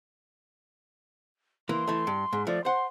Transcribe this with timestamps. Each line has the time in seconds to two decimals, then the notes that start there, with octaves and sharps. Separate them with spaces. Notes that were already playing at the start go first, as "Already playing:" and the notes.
1.69 E3 A#3 C6
1.87 E3 A3
2.07 G2
2.33 G#2
2.47 F3 A3 D5
2.65 C5 F#5 C6